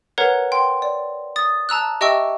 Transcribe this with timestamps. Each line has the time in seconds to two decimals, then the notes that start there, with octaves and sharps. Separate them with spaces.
0.18 A#4 B4 C#5 F#5 A#5
0.52 G5 C6
0.82 D5
1.36 D#6 A6
1.69 A5 A#5 E6 F#6
2.01 G4 D#5 E5 G5 C#6 E6